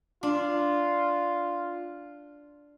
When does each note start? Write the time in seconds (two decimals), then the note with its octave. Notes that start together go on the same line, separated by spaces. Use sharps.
0.23 D4 F4